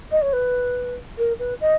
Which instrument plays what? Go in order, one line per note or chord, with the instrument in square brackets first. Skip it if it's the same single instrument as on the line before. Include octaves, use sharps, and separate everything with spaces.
[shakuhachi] D#5
C#5
B4
A#4
B4
D#5